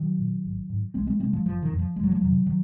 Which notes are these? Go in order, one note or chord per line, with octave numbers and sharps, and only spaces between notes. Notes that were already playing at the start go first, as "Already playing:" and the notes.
Already playing: D#3 F#3
A#2
G#1
G#2
C2 G#3 C4
G#3 C4
C3 G#3 C4
F3 G#3
F#1 F3
D#3
F2 C3
F3
F#1 G#3
F#3
F3 G#3
F2 C3 D#3 F#3
D#3 F#3